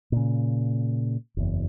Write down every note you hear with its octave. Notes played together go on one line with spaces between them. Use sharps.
A#2 C#3
F#1 E2